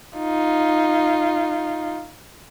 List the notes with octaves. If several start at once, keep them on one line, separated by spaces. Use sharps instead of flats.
D#4 F4